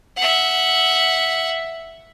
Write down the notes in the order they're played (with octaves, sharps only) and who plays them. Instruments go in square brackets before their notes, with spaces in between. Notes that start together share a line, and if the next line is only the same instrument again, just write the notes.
[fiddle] E5 F#5